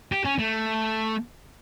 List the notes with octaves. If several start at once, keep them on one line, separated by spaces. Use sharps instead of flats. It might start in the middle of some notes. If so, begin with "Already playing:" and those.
G4
C#4
A3